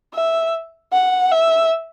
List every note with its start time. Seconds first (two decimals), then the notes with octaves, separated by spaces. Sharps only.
0.13 E5
0.93 F#5
1.31 E5